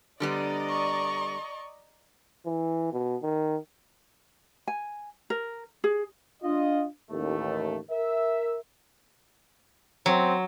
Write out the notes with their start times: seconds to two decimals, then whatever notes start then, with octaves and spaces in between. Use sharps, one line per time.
0.20 D3 G3 B3 D5 D#5 A#5
0.69 C#6
2.45 E3
2.92 B2
3.22 D#3
4.67 G#5
5.30 A#4
5.84 G#4
6.43 D4 F4 D#5
7.11 A1 D#2 A3
7.91 A#4 E5
10.06 F#3 C4